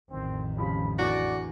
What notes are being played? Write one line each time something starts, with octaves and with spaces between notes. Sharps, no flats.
A1 F2 D#3 C4
C#3 F3 G3 B5
E2 D3 F#4 D5